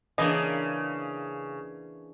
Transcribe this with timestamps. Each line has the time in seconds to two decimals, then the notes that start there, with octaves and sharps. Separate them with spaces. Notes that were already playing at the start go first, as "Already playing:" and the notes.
0.18 C#3 E3 A#3 D4 D#5